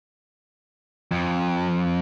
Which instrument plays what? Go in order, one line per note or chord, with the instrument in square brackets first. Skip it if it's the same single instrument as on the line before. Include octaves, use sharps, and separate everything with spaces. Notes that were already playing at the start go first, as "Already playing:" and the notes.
[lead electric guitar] F2